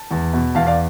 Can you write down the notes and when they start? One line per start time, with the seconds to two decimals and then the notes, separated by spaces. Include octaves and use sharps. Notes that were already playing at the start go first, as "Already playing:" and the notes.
Already playing: A5
0.11 E2
0.33 B2
0.55 E2 F5 A5
0.67 D5 F5